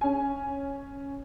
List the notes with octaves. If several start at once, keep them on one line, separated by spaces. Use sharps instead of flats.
C#4 G#5